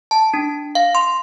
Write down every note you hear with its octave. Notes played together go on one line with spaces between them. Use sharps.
A5
D4
F5
C6